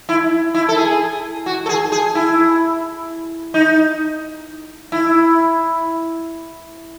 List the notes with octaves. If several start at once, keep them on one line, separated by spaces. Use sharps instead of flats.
E4
E4
A4
G#4
F#4
A4
G#4
G#4
E4
D#4
E4